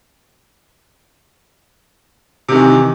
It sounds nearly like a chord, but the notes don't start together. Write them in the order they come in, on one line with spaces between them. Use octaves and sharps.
C3 D#3 E3